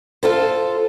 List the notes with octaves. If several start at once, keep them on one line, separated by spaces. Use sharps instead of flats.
F4 A4 C5